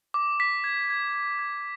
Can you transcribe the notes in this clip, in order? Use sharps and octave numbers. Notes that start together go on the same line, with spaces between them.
D6
B6
G#6
G#6
G#6
G#6